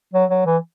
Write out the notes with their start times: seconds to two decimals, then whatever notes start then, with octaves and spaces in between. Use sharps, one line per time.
0.14 F#3
0.30 F#3
0.46 E3